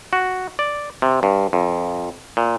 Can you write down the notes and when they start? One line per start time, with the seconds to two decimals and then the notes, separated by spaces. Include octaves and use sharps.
0.13 F#4
0.59 D5
1.02 C3
1.23 G2
1.53 F2
2.37 A#2